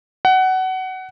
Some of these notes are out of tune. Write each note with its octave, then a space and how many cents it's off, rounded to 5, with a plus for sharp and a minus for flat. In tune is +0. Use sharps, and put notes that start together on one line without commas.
F#5 +20